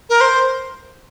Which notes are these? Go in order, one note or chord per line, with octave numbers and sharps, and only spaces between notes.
A#4
C5